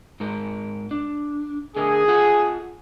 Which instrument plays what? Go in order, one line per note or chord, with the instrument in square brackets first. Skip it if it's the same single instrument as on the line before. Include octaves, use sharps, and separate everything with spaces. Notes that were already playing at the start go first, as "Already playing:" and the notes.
[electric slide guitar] G#2 G#3 A#4
D4
[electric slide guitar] D3 A3 A#4 [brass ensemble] G#4
[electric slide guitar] F4 A4 F#5